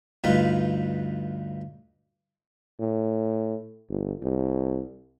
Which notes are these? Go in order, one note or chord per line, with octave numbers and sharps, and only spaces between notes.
D2 G2 D#4 F4 B4
A2
G1
C2